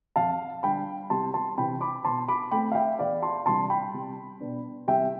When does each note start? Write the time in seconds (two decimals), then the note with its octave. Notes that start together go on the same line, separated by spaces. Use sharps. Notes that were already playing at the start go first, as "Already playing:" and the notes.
0.16 F2 F5 A5
0.63 D3 G3 D4 G5 B5
1.10 C2 A5 C6
1.34 A5 C6
1.57 C3 E3 G5 B5
1.81 B5 D6
2.05 B2 A5 C6
2.28 B5 D6
2.51 A3 C4 G5 B5
2.72 F5
2.75 E5 G5
2.99 E2 D5 F5
3.22 A5 C6
3.46 C3 E3 G3 D4 A5 C6
3.70 G5 B5
3.94 C2
4.40 B2 B3 D4
4.88 C2 E5 G5